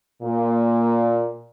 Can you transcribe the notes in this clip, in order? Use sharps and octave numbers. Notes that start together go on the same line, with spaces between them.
A#2